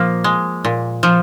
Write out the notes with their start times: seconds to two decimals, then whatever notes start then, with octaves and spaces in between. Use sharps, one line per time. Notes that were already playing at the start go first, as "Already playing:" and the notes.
Already playing: A#2 F3 A#3
0.24 G#3
0.65 A#2
1.03 F3